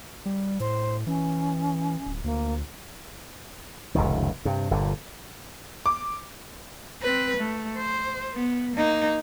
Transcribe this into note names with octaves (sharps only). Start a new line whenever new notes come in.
G3
A2 C5
E3 C#4
D1
D2 A#3
F1 C#2 F#2 D#3
G2 C3
G1 A#2 D3
D6
C4 B4
A3
C5
B3
A#3 D#4